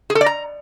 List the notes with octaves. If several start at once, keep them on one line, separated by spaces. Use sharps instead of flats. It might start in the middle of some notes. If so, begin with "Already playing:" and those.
G#4
A4
D5
A#5